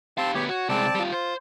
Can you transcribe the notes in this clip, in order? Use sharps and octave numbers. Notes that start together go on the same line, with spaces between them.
C4 G4 F5 A5 C6
D2 B3 G4 C#5
F#4 C#5
C2 G#3 C4 D5 A5
G3 F4
F4 C5